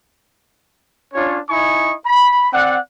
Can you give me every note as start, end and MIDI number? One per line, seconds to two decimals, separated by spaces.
1.14 1.38 61
1.14 1.38 62
1.14 1.38 65
1.14 1.38 73
1.50 1.94 63
1.50 1.94 64
1.50 1.94 75
1.50 1.94 80
1.50 1.94 85
2.06 2.49 83
2.53 2.78 60
2.53 2.78 74
2.53 2.78 78